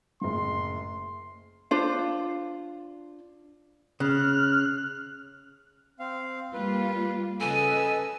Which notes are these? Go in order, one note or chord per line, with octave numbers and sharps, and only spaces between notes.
F#1 A2 C6
D4 F4 C5
C#3 F6 F#6
C4 F5
G3 A#3 F4 B4
C#3 A4 B4 D#5 G#5 E6